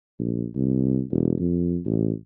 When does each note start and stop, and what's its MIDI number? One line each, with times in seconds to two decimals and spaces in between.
0.19 0.46 34
0.55 1.02 36
1.11 1.34 28
1.40 1.79 41
1.86 2.12 33